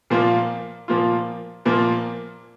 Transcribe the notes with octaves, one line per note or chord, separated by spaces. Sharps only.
A#2 F3 A#3 F4
A#2 F3 A#3 F4
A#2 F3 A#3 F4